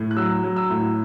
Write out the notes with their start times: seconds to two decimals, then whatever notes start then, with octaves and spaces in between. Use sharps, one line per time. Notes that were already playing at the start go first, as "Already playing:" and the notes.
Already playing: A2
0.11 F#6
0.17 F#3 E6
0.43 F#3
0.56 E6
0.70 A2